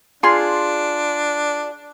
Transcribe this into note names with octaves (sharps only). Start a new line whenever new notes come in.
D4 F4 G#4 C6